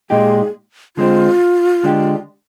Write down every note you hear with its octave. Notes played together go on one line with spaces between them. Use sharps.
A#2 G#3 D#4 G4 G#4
D3 G#3 C4 F4
D3 G#3 D4 G4